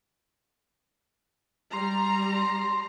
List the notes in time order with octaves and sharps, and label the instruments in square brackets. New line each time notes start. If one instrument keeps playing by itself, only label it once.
[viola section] G3 A#5 [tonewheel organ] C6